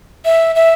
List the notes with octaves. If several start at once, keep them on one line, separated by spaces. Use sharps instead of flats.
E5
E5